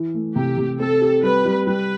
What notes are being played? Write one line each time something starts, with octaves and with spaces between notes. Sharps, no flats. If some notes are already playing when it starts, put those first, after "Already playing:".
Already playing: E3
A3
C3 G4
C3
C4 A4
G4
G3 B4
G3
G3 B4